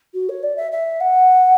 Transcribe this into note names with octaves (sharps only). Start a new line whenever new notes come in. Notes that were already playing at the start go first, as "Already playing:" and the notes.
F#4
C#5
D5
E5
E5
F#5